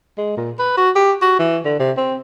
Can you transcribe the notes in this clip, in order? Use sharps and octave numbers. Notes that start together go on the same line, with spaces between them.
G#3
A#2
B4
F#4
G4
F#4
E3
D3
C3
C4